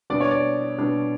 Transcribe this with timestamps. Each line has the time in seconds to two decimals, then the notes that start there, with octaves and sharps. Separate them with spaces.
0.10 B2 G3 D4 D5
0.20 C#5
0.31 D5
0.78 B2 G3 D4